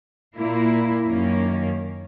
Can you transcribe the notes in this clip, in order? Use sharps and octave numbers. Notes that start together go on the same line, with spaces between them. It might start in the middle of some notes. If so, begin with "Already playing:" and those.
A#2 A#3 E4
F#2 D#3 A#3 C#4